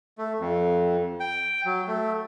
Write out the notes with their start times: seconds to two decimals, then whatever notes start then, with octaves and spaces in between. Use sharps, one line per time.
0.18 A3
0.40 F2
1.20 G5
1.65 F#3
1.87 A3